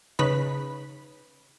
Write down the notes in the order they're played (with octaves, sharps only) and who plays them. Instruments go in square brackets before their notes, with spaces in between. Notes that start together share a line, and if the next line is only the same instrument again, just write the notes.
[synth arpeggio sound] C#3 D#4 B4 B5